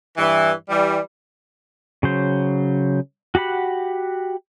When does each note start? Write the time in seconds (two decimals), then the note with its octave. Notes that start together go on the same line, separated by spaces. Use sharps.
0.18 G2 E3
0.69 E3 G3
2.03 C#3 F#3 C5
3.35 F#4 G4 F#5 B5